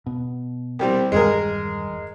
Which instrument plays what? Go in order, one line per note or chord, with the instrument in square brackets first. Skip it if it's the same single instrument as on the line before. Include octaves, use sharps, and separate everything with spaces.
[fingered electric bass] B2
[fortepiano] C2 G3 C4
[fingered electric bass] E1 G2 D#3 [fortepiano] G#3 G#4 A#4